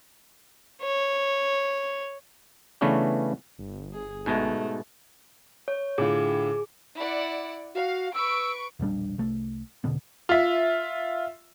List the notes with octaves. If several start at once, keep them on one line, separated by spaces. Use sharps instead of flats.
C#5
C#3 E3 A3 B3 C#4 D4
G1
G#4
G#2 B2 G#3 A3
C#5
A2 D3 F4 G#4 D6
E4 D5 F#5
F#4 F5
B4 C#6 E6 D7
E1 A#1 G3 D4
C2 A3
E1 B2 D3 B3
F4 E5